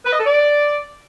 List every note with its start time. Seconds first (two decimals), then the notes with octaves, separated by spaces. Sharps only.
0.05 B4
0.12 D#5
0.19 A4
0.25 D5